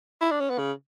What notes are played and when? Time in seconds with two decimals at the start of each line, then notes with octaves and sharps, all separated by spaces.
0.21 E4
0.31 D4
0.40 C#4
0.50 B3
0.58 C#3